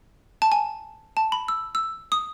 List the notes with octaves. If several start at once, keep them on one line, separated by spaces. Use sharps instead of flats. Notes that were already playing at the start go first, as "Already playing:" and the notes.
A5
G#5
A5
B5
E6
E6
D#6